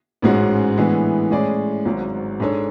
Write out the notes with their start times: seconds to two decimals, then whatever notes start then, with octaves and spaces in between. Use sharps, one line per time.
0.22 A1 G#2 G#3 C#4 F#4
0.77 A2 E3 G#3 B3 D4
1.31 A2 G#3 C#4 G#4 D5
1.85 G#1 G#2 F#3
2.40 G#2 G#3 D4 A4 C#5